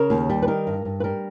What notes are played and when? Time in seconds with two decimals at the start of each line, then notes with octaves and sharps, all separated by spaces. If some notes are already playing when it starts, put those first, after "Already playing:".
Already playing: C#3 A#4
0.10 D#2
0.30 G3
0.42 B4
0.47 D#3 A#4
0.67 G2
0.85 G2
1.00 B4
1.04 G3 A#4